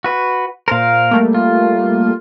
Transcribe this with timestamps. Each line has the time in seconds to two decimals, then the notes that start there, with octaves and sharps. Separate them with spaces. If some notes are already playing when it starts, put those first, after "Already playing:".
0.04 F#4 B4
0.68 A#2 A#4 C5 F5
1.11 G3 A3 A#3
1.35 F4